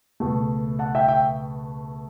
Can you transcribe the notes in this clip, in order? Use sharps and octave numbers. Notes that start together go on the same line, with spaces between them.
C#2 B2 A3
F#5 A5
E5 G5
E5 G5